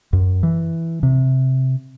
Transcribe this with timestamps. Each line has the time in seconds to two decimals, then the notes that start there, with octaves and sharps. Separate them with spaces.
0.13 F#2
0.43 E3
1.03 C3